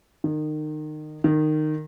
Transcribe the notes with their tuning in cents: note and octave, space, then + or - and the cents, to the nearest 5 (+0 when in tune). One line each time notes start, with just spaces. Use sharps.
D#3 -30
D#3 -20